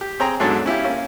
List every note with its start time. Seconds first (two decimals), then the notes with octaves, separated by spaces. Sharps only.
0.01 G4
0.20 C4 G#4 C#5 G5 A#5
0.40 E2 G#2 F#3 D4 A4 C#5
0.66 C#4 E4 F4 G4
0.84 A#3 C#4